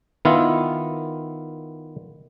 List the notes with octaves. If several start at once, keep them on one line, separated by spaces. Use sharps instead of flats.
D#3 B3 E4 F4